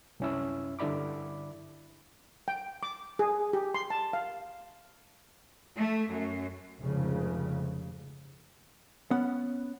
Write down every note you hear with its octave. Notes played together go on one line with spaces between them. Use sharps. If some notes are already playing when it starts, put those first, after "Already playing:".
C2 F#2 C#4 E4 E6
G2 D3 E4 D5 B5 D6
G5
D6
G#4
G4
C6
A5
F5
A3
F#2
F1 G#2 C#3
B3 C#4 F#5